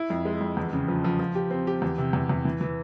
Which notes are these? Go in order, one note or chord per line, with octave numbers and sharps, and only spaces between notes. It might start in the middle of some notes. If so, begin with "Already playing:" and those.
Already playing: E4
F2
G#3
F2
E2
C#3
F3
F3
F3
G4
C4
G4
E2
C3
E2
E2
E3
E3